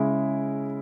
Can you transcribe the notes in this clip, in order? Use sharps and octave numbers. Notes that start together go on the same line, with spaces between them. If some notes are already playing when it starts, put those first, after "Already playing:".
Already playing: C#3 G#3 C#4 E4